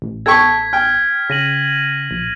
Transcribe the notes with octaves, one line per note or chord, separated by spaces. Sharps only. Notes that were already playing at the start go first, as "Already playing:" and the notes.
A1
A4 G5 C#6 G#6 B6
G5 F6
C#3 A#6 D#7 F#7
A#1